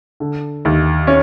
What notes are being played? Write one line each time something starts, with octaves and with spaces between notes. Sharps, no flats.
D3
D#2
C#4